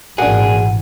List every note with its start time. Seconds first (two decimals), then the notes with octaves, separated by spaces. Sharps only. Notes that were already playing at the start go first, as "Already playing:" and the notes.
0.18 G#1 A#2 E3 A#3 D4 F#4 G#4